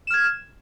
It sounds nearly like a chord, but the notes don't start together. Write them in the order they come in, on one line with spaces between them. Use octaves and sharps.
E7 F6 G#6